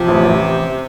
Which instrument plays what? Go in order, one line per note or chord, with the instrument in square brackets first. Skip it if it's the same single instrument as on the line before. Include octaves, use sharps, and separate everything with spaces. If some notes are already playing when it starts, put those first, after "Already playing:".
Already playing: [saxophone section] C3 [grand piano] F3
[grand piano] A1
A1